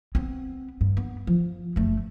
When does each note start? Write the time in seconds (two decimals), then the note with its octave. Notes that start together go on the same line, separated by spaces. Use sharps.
0.15 B3 C4
0.81 G2
0.97 B3
1.27 F3
1.76 F#1 A3